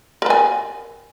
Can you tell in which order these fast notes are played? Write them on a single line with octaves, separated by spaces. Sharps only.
A#4 B4 G#5